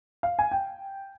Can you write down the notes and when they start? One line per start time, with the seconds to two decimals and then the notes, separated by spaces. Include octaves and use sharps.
0.23 F5
0.39 G#5
0.51 G5